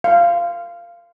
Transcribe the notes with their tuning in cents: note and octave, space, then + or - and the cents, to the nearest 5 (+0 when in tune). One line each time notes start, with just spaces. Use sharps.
F5 -15